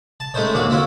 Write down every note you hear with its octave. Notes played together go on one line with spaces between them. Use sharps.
A5
G#3 A3 C#4 D#4 C5 C#5
D#2 A#2 A#3 D4 F#4 D5
D3 C4 E4 F4 C#5